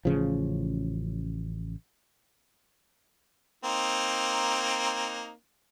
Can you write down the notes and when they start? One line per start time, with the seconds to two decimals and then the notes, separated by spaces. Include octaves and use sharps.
0.05 A1 C#3 F3
3.64 A#3 C4 D#4